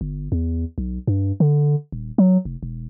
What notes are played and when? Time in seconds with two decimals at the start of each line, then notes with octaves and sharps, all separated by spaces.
0.01 G1
0.32 E2
0.78 B1
1.07 G2
1.40 D3
1.92 D#1
2.18 F#3
2.45 F1
2.63 E1